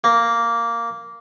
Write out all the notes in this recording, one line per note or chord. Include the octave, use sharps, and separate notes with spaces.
A#3